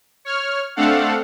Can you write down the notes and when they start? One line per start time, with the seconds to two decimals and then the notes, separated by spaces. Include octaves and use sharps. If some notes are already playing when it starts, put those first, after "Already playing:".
0.25 C#5 F6
0.76 A3 C4 D4 A4 F5 F#5